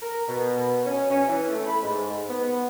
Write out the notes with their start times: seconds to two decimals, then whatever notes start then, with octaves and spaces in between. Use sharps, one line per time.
0.02 A#4
0.28 B2
0.85 C#4
1.11 C#4
1.28 E3
1.50 A3
1.66 B5
1.83 G#2
2.29 B3